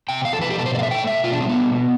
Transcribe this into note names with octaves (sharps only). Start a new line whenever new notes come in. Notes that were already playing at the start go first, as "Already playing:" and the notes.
C3 G5
E2 F5
A4
F3 B4
G4
B2 A4
C5
A3 D5 F5
E5
A3 G5
B2 E5
B2 F4
D4
G3 C4
B3
B2
B3